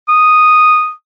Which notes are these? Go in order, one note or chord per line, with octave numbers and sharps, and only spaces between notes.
D#6